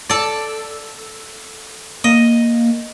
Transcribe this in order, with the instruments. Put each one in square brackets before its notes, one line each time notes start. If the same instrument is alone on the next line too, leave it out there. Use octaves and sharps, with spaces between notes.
[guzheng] A4 D5
[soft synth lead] A#3 [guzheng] D#5